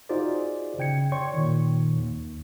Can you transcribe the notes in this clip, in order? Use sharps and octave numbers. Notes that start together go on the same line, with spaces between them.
D#4 F4 F#4 G#4 C5 D5
C#3 G5 G#6 C#7
C#5 D5 G5 C6 C#6
A#2 D#3
D#2